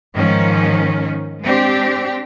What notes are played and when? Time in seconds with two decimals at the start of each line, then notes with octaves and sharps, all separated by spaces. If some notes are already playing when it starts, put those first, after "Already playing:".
0.13 G#2 D#3 F3 C#4
1.42 G#3 C4 D4 G4